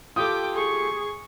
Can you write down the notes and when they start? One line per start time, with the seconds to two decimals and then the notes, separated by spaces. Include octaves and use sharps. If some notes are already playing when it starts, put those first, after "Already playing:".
0.16 F4 G4 A4 G5 D6 D#6
0.54 G#4 C#6